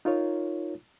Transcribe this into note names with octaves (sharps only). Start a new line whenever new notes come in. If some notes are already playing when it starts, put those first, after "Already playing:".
D#4 F4 A#4 C#5